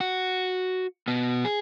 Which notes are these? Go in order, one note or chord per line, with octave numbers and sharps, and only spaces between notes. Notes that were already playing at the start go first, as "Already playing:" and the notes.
F#4
B2 B3
G#4